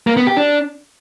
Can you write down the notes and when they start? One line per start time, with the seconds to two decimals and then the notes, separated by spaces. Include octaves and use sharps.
0.07 A#3
0.17 B3
0.27 G4
0.37 D4